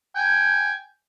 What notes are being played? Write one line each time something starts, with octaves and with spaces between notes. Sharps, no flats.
G5 G#5